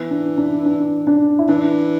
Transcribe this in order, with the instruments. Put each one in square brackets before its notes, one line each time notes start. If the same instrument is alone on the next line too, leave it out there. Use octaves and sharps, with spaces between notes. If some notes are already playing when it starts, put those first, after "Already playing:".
Already playing: [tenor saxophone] E3 [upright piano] B3
[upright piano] D4
D4
D4
D4
E4
[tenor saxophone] E3 [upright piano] D4